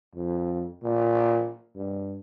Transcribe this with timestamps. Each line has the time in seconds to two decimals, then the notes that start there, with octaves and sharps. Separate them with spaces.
0.15 F2
0.83 A#2
1.75 G2